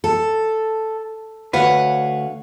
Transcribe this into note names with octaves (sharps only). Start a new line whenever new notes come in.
A4
D2 B4 C#5 F5 F#5